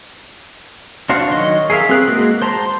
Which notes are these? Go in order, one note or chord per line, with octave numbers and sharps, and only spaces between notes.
D4 F#4 C5 F5 F#5
D#3 F#3 D#5 C#6
G#4 A#4 E5 F5
C4 G#4 A#4 B4 F#6
G#3 A#3 F#4
C5 A5 A#5 C6